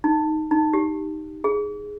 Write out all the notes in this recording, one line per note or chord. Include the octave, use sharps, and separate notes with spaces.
D#4
D#4
G4
G#4